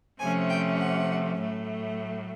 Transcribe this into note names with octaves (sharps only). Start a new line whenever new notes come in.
C3 F3 A3 C#4 G#5
G5
F#5
A2 F#3 A3